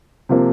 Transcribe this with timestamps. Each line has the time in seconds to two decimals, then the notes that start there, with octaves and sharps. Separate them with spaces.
0.29 C3 F3 A#3